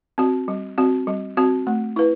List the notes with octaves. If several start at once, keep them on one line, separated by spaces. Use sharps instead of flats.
C4 F#4
G3
C4 F#4
G3
C4 F#4
A3
E4 B4